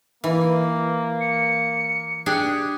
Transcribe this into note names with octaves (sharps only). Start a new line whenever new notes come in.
E3 A#3
C#7
D4 G4 G#4 F#6